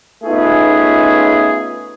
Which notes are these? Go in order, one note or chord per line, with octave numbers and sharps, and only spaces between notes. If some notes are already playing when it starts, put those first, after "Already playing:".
A3 B3 C#4 D#4 F4 G#4